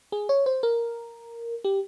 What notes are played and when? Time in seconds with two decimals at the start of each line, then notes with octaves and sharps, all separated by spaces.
0.12 G#4
0.29 C#5
0.46 C5
0.63 A#4
1.64 G4